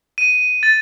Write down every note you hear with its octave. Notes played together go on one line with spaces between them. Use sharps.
D#7
D#7
A6